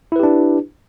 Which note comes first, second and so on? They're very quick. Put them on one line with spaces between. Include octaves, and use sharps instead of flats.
E4 B4 G4 D4